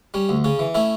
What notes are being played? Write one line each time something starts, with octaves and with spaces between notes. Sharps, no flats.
G3 C#4
D2
C#3 C#4
E3
A3 C#4 E4